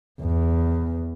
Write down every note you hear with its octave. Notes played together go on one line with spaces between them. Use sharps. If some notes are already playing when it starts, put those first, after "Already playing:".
E2